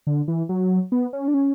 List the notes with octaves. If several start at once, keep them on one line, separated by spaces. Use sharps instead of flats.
D3
E3
F#3
B3
C#4
D4
C#4